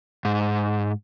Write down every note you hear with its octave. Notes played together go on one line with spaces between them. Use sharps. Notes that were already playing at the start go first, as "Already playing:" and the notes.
G#2